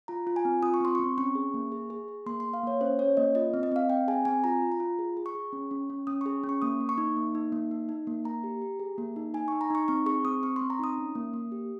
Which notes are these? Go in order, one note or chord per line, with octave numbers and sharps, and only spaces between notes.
F4 A#5
F4
G#5
C4
F4 D#6
C#6
C4 C6
C4 C#6
C#4 C#6
G#4
A#3
G#4
G#4
G#4
A#3 C6
A#3 C6
F5
A#3 C#5
C#4 C5
C#4 C#5
A#3 D#5
F4 D#5
C4
D#5
C4 F5
C4 G5
G#4 G#5
C4 G#5
F4 A#5
F4
A#5
F4
G#4
G#4
C#6
G#4
C#4
C#4
C#4
C#4 D#6
G#4 C#6
C#4
C#6
A#3 D#6
A#3
C#6
D#4
A#3
D#4
A#3
D#4
D#4
A#3
A#3 A#5
G4
G4
G#4
A#3
D#4
D#4 G#5
D#4 C#6
A#5
D#4 C#6
C4 C#6
G#4 C#6
C4 D#6
C4 C#6
C6
C4
A#5
D#4 D#6
C#4
A#3
A#3
G4